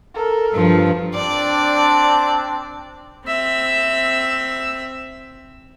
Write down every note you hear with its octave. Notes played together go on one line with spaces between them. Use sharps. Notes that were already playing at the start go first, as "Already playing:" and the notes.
A4 A#4
G2 F3
C4 D4 D5
C4 E5